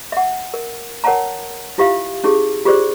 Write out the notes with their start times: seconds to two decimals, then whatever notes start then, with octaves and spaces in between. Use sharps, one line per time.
0.12 E5 F#5
0.54 A#4
1.04 A#4 C#5 F#5 G5 A5 A#5
1.78 E4 F4 G4 E5 F5
2.24 C#4 E4 G4 G#4
2.65 F4 G4 G#4 C5 D5